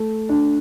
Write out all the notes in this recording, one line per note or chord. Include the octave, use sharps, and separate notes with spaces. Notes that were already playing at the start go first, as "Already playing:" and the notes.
Already playing: A3
D4